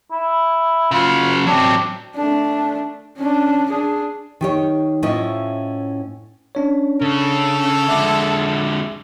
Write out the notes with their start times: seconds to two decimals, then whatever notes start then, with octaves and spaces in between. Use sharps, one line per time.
0.11 E4
0.91 C#3 F#3 F4
1.47 F#3 C4 D4
2.16 A3 D4
3.17 C#4 D4
3.70 D4 G#4
4.41 D#3 G4 C#5
5.03 A2 C#4 E4 F4 C5 D#5
6.55 C#4 D4 C#5
7.01 C#3 A4
7.88 D3 G#3 E5 D6